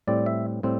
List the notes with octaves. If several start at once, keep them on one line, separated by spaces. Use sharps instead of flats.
A2 G3 C4 D5
E5
A2 G3 C4